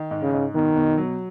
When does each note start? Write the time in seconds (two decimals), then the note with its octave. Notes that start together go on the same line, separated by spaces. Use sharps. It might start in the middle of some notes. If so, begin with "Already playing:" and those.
Already playing: D#3
0.11 G#2
0.22 C#3
0.33 G#2
0.55 B2 D#3
0.76 B2
0.97 F#3